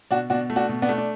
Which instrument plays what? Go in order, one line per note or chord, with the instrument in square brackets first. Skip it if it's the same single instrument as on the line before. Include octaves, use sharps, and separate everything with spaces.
[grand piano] B2 D4 F#4
B2 D4 F#4
A3
D4 F#4
B2
B3 D4
A3
D4